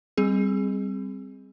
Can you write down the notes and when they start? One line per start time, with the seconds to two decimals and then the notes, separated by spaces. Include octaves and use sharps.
0.17 G3 C4 G#4